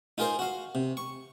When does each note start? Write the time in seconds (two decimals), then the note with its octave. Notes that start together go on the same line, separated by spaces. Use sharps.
0.18 D#4 F4 G#4 A#4 C5
0.39 F#4 F5
0.75 C3
0.97 C#6